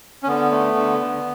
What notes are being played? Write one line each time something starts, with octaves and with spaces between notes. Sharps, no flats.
C#4
D3 B3
A3
D3
D3